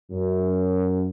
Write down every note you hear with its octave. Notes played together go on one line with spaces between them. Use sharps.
F#2